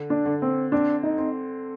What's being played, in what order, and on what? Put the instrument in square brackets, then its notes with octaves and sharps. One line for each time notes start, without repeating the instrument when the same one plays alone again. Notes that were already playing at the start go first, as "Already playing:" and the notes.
Already playing: [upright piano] D3
[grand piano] D4
[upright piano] D3
[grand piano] C4
[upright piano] C4 [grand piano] D4
[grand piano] D#4
[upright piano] C4